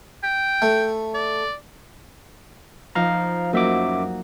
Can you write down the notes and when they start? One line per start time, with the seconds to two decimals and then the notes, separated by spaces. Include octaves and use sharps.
0.23 G5
0.62 A3
1.14 D5
2.95 F3 D#4 F5 A#5
3.53 F#2 F#3 A#3 D#4 E5 D6